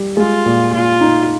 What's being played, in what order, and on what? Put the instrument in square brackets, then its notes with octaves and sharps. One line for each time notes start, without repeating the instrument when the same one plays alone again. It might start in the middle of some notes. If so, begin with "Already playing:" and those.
Already playing: [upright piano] G3
[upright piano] G#3 [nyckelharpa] F4
[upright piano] A#2
[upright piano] A#2 [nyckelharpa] F4
[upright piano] D#4